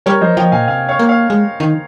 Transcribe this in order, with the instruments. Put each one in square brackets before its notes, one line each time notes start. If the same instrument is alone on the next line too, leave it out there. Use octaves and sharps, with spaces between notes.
[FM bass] G3 [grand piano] A#4 C#5
[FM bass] F3 [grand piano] C5 D#5
[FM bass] F3 [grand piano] D#5 G5
[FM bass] A#2 [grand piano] F5 G#5
[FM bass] C3 [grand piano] F5 G#5
[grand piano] C#5 F5
[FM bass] A#3
[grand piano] C#5 F5
[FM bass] G#3
D#3